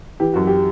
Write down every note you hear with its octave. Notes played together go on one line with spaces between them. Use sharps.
E3 G4
F#2 F#4
G4